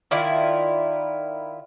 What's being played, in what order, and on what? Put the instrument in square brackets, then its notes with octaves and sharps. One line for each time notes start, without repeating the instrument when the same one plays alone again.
[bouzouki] D#3 E4 F4 D5